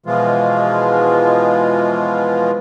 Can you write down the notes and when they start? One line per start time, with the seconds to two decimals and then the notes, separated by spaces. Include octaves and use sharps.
0.06 B2 E3 F3 G#3 F4